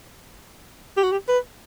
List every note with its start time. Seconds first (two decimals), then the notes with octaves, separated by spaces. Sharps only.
0.97 G4
1.03 F#4
1.12 G4
1.28 B4